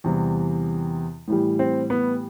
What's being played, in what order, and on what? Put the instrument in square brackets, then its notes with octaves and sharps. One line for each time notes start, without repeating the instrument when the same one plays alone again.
[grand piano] E2 C3 E3 G3
A2 E3 G3
C4
B3